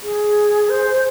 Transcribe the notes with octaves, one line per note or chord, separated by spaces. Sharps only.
G#4
C5